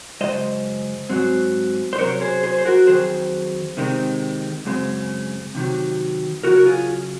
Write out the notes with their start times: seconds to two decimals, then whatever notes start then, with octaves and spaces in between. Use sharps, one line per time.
0.21 F#2 C#3 G#3 C5 D#5
1.10 G#2 F#3 C4
1.93 C5
1.99 C3 F#3 C#4 A#4 C#5
2.21 G#4 C5
2.43 G#4 C5
2.58 C5
2.65 F#4 A#4
2.87 F2 D#3 F#3 G#4 C5
3.77 C3 D#3 G#3 C4
4.65 F#2 C#3 G#3 C4
5.55 C3 D#3 F#3
6.43 C#3 F#3 C#4 F#4 A#4
6.58 A#4
6.66 F4 G#4